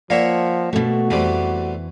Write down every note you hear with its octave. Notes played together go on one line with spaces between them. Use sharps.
F3 A#3 C#5 D5 E5 F#5
B2 A3 F#4
F2 C3 E3 G3 A3